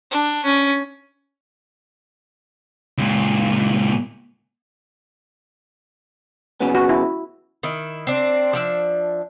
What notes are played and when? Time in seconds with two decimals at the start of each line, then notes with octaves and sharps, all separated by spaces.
0.11 D4
0.44 C#4
2.98 C#2 A#2
6.61 C#3 F#3 B3
6.75 F#4
6.89 E4
7.63 D#3 E4
8.07 C4 D4
8.53 F3 D4 E5